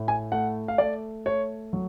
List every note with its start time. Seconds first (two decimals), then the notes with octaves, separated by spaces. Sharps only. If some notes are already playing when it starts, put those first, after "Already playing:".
Already playing: A2
0.08 G#5
0.32 A3 F#5
0.68 F5
0.78 A3 D5
1.26 A3 C#5
1.73 F#3